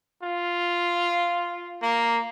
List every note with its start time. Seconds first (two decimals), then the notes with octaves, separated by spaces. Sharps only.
0.23 F4
1.82 A#3